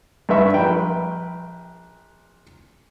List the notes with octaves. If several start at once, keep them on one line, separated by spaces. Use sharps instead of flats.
G2 B4 E5 C#6
A#1 B4 G5